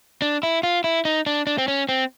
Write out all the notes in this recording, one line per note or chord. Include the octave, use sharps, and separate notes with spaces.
D4
E4
F4
E4
D#4
D4
D4
C4
C#4
C4